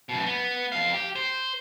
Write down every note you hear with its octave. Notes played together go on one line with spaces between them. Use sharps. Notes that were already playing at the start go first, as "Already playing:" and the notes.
F#2 B2
B3
F2 F5
G4
C5